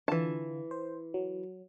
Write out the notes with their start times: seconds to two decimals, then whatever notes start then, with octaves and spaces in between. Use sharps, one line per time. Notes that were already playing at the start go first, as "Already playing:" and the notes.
0.08 D3 E3 F4 A5
0.71 C5
1.14 F#3